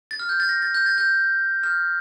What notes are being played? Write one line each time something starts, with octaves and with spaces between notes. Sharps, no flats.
A6
F6
G6
A6
A#6
A6
G6
A6
G6
F6